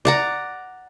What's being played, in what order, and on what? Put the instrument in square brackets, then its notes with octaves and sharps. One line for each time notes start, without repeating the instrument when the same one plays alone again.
[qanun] D5 F#5 A#5